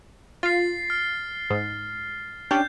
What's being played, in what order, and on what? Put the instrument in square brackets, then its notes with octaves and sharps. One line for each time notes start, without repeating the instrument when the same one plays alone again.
[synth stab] F4 [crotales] A6 C7
[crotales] F6
[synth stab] G#2
[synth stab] C#4 D4 G4 [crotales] G6